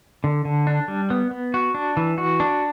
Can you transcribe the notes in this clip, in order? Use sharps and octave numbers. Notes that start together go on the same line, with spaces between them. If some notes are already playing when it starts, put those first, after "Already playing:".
D3
D3
D4
G3
B3
B3
F#4
D4
E3
F#4
D4